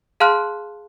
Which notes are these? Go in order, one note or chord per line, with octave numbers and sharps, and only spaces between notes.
G#4 F5 A5 C6 F6 F#6